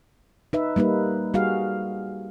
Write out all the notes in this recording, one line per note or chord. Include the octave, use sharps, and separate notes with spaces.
D#4 B4 E5
G3 A#3 D#4 B4
G3 F#4 G#4 F5